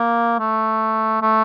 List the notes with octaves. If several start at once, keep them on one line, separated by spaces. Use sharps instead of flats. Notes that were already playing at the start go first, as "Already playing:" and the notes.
Already playing: A#3
A3
A3